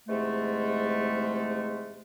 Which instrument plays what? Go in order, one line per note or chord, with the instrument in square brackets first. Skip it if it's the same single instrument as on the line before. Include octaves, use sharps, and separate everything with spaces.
[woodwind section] E2 G#2 C3 G#3 A3